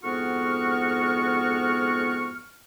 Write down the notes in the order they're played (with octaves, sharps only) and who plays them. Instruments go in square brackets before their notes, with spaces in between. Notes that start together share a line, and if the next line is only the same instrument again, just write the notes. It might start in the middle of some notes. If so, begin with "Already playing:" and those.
[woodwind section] F2 G#2 B3 F#4 C#6 F6